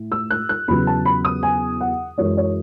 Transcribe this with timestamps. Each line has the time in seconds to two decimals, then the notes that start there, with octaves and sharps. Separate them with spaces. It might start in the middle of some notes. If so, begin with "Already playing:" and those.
Already playing: A2
0.12 E6
0.30 F#6
0.49 F#6
0.68 E2 C#3 F#3 B3 B5
0.87 A5
1.06 B5
1.25 D#6
1.43 G#5
1.81 F#5
2.18 F#2 E3 G#3 C#5
2.37 C#5